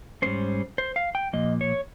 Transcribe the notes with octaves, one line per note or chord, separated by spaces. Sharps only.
G#2 G3 A#3 C#4 C5
C5
F5
G5
A#2 F3 A#3 D#5
C#5